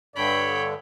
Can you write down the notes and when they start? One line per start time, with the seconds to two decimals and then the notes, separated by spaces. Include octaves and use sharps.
0.16 G2 D3 C#5 G5 B5